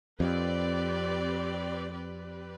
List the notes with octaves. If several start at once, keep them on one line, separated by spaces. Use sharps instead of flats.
F2 C4 G4 B4 D5
C4 G4 B4 D5